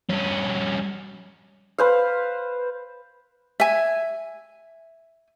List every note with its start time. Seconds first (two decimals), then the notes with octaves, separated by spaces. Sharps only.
0.09 G2 C#4
1.78 B4 C5 F5
3.60 E5 G#5